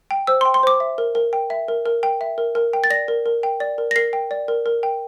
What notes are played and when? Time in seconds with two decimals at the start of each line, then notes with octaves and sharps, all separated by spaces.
0.11 G5
0.27 C5 E6
0.41 C6
0.45 G5
0.54 C6
0.63 C5 D6
0.80 E5
0.98 A#4
1.15 A#4
1.33 G5
1.50 E5
1.68 A#4
1.86 A#4
2.03 G5
2.21 E5
2.38 A#4
2.55 A#4
2.73 G5
2.84 A6
2.90 D5 A#6
3.08 A#4
3.26 A#4
3.43 G5
3.60 D5
3.78 A#4
3.91 A#6
3.96 A#4 C7
4.13 G5
4.31 D5
4.48 A#4
4.66 A#4
4.83 G5